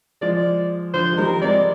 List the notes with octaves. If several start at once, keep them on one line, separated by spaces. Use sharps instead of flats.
F3 G#3 D5
D5
D3 F3 C5
G#3
D#3 G3 A#4
G#3 C4 D5